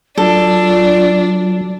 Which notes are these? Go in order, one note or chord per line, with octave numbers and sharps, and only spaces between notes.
F#3 D4 F4 A4